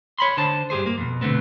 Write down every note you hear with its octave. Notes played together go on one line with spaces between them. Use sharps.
C#5 B5 C6
D3 C5 A5
G2 G4 G#4 C5
A#3
F2 B2
B2 D3 A3 B3 C4